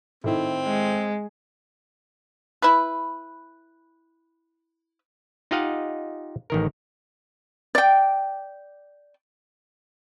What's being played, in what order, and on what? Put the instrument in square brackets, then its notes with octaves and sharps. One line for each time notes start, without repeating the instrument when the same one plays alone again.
[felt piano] A2 D#3 E4 [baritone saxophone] C4
[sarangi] G#3
[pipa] E4 B4
[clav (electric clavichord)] D#4 F4 G4 D#5 F5 F#5
A1 D#3 A#4
[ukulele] D5 G5